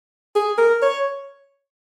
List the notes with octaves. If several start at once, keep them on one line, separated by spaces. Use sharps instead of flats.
G#4
A#4
C#5